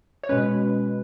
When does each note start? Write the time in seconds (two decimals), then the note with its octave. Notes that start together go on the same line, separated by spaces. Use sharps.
0.23 C#5
0.29 B2 G#3 C#4 B4